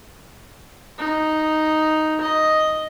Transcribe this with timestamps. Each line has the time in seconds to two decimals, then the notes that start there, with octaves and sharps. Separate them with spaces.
0.98 D#4
2.21 D#5